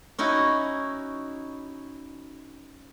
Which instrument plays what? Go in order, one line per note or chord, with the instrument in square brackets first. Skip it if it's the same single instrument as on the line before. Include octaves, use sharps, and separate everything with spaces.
[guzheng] C#4 D#4 E4 F#4